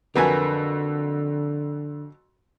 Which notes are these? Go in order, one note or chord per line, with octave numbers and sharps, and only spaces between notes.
F2 D3 F#3 A#4 B4 G#5